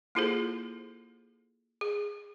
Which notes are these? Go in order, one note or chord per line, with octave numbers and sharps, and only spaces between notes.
A#3 E4 F4 G#4 A4 C5
G#4